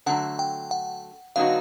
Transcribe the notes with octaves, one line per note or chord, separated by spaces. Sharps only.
D3 F#3 A3 F#5
G5
F#5
D3 F#3 B3 D#4 F#4 F5